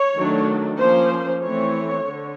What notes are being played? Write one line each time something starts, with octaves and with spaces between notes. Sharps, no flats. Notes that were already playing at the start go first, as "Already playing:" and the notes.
Already playing: C#5
D#3 F#3 A3 D4
F3 A#3 C#4 C5
E3 A3 C4 C#5
D3